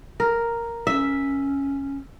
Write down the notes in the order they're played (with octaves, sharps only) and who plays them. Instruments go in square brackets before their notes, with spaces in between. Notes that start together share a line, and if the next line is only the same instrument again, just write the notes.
[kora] A#4
[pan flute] C#4 [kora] E5